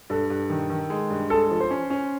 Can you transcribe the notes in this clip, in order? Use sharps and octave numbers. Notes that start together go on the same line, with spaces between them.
G2 A4
G2
D#3
D#3
G#3
G2
G#3 A4
F3
C5
C#4
C#4